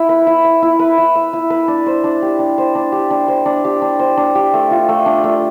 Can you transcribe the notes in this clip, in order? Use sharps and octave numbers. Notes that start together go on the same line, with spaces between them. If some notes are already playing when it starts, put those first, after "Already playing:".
Already playing: E4 E5
B4
E4
E5
E4
B4
E4
E5
E4
B4
D4
C5
D4
G4
D4
C5
D4
G4
D4
C5
D4
G4
D4
C5
D4
G4
A3
F4
A3
D4
A3